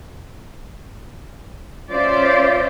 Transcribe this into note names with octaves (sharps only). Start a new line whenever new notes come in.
C#4 F4 C5 D5 E5